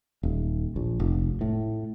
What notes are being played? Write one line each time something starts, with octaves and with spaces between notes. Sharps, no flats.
D#1
A#1
F1
A2